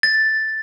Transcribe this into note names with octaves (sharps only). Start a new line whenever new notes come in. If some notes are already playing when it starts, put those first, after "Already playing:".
A6